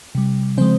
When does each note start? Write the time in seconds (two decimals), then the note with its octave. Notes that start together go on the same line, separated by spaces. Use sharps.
0.15 C3 G3
0.57 C#3 F3 G#3 C4 C5